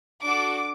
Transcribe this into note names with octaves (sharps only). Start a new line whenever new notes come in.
D4 F#4 A4 D6